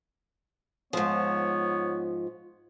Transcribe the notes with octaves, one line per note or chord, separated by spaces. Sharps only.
G#2 F3 B3 C#5